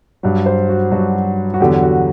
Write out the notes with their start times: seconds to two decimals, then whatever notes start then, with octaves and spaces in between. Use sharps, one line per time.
0.23 G2 F#3
0.46 C5
0.69 F#4
0.92 G2 F#3 F#4
1.54 F#4
1.60 E2 D3 F#3 G4
1.83 F#4